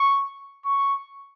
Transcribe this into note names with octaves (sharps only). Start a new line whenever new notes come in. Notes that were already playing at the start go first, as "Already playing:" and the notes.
Already playing: C#6
C#6